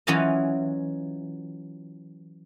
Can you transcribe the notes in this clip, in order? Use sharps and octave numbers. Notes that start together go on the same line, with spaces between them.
E3 F#3 C#4 F4 D#5